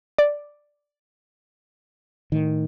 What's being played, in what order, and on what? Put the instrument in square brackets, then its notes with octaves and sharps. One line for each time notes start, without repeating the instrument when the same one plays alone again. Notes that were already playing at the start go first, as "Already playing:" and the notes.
[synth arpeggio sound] D5
[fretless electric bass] A2 D#3